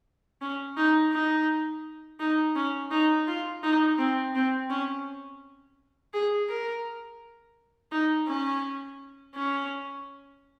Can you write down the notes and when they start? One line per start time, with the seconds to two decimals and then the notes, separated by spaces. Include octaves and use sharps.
0.41 C#4
0.77 D#4
1.12 D#4
2.20 D#4
2.56 C#4
2.91 D#4
3.27 F4
3.63 D#4
3.98 C4
4.35 C4
4.70 C#4
6.13 G#4
6.49 A#4
7.92 D#4
8.28 C#4
9.35 C#4